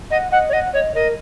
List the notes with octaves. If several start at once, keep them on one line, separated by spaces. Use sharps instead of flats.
D#5 F#5
D#5 F#5
C#5
D#5 F#5
C#5 D#5
A#4 D#5